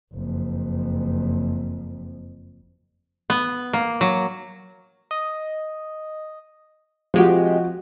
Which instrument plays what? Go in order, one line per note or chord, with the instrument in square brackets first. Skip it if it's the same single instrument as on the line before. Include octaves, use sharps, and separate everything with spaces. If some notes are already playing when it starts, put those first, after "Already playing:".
[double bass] F#1 F2
[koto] B3
A#3
F#3
[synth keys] D#5
[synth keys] C3 G#3 G4 [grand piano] F3 F#4